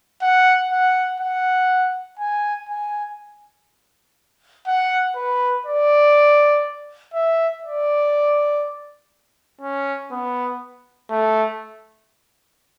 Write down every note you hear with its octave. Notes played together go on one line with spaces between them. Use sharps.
F#5
F#5
F#5
G#5
G#5
F#5
B4
D5
E5
D5
C#4
B3
A3